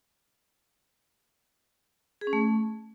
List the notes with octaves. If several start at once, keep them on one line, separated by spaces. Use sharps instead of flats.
G#4
C#4
A3